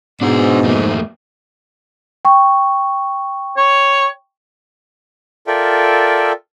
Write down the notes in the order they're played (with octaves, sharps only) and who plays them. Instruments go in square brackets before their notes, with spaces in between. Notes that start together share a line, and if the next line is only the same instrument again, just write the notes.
[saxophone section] G#2 [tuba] B2 [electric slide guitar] D4 C5
[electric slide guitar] F2 A3 A#3
[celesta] G5 C#6
[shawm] C#5
[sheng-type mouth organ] F4 A4 A#4 D5 E5 G5